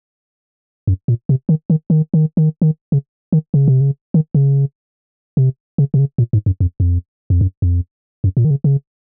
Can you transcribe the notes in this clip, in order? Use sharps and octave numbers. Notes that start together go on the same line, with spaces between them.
F#2
A#2
C3
D#3
D#3
D#3
D#3
D#3
D#3
C#3
D#3
C#3
C3
C#3
D#3
C#3
C3
C#3
C3
C#3
A#2
G#2
F#2
F2
F2
F2
F#2
F2
F#2
A#2
D#3
C#3
C#3